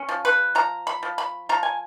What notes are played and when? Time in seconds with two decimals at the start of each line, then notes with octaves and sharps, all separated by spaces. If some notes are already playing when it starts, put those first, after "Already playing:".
Already playing: C#4
0.09 F3
0.25 B4
0.55 F3 A#5
0.87 B5
1.03 F3
1.18 B5
1.49 F3 A#5
1.63 G#5